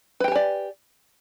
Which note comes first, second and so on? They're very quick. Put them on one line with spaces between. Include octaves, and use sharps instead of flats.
B4 G5 G4 G#5 D5